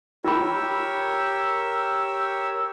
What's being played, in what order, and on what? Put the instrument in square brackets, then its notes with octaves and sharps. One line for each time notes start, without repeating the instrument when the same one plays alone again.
[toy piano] F4 B5 [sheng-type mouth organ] G4 A#4 C#5 [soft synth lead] E6